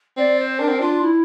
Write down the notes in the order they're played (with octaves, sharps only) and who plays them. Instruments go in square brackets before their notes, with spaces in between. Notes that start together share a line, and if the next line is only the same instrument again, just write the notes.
[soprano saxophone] C4 [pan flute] D5
[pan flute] C5
[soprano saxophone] D4 [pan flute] A#4
[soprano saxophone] C4
[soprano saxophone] D4 [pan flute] F4
[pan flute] E4